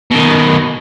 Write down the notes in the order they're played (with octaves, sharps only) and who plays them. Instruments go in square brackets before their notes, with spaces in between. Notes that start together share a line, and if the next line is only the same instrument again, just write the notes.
[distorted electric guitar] B2 D#3